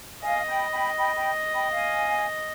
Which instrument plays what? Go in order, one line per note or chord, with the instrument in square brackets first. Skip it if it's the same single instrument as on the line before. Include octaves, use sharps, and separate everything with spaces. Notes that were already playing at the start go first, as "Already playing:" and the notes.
[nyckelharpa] D#5 [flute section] F5 G#5
[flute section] G5 B5
G5 B5
G5 B5
G5 B5
G5 B5
F5 G#5